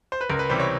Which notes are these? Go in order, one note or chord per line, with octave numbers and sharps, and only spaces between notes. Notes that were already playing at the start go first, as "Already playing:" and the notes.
C5
B4
C#2 A#4
B4
C3 E3 G3 C5
C#5